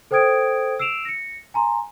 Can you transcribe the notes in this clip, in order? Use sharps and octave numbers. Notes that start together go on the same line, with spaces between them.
A4 C5 G5 D#6 G#6 D7
E6 C7 D7 E7 F7
A#6 C#7
G#5 A#5 C6